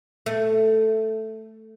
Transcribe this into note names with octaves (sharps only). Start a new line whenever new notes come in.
A3